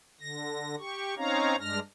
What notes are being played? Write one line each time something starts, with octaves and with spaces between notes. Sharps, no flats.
D3 A#6
G4 C#6
C4 C#4 D#4 C#5 F5 A#5
G2 G#3 D4 F6 A#6